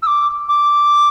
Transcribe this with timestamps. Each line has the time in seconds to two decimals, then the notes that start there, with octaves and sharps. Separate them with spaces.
0.02 E6
0.07 D6
0.49 D6